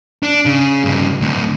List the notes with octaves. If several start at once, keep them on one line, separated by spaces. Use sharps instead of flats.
D4
C#3
G2 C#3
D2 A2